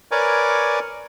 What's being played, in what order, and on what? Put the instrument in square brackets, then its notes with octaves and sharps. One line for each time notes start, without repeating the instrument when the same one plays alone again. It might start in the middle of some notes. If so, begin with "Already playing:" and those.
[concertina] A#4 B4 C#5 D5 G#5 D6